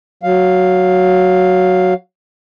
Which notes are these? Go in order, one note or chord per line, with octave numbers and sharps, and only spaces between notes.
F#3 F5